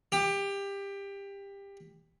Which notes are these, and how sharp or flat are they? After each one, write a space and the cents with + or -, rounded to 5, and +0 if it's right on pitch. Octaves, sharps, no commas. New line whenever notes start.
G4 +20